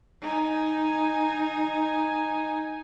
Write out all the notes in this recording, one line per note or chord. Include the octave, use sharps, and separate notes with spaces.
D#4 G#5